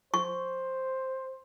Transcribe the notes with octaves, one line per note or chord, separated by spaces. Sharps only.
C5 C#6